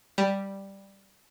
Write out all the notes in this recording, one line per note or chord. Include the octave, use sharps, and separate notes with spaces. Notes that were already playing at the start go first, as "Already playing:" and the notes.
G3